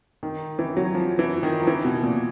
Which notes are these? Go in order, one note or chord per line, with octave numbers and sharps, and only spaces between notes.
D#3
E3
F#3
F3
E3
D#3
F3
E3
B2
A#2